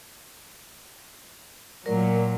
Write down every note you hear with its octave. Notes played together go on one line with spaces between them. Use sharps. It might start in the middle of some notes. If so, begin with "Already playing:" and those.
A#2 F#3 A#4 D5